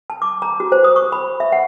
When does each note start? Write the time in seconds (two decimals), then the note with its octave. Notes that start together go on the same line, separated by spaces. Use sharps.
0.10 A5
0.22 D6
0.42 A#5
0.60 F#4
0.72 C5
0.84 D#6
0.96 C#6
1.12 B5
1.40 E5
1.52 F#5